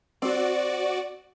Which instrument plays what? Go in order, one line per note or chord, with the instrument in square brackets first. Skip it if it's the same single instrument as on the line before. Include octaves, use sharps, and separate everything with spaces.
[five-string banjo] C4 [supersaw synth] F#4 D5